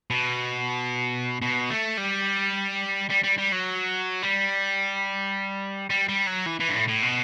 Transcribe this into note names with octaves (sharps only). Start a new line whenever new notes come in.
B2
B2
A3
G3
G3
G3
G3
F#3
G3
G3
G3
F#3
E3
E3
G2
A2
A2
B2